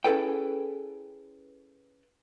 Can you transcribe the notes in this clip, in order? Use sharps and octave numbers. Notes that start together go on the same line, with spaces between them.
C#4 E4 G#4 A4 B4 G5